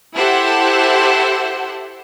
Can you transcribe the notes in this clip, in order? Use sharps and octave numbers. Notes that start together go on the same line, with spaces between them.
E4 G4 A4 C5 E5 F#5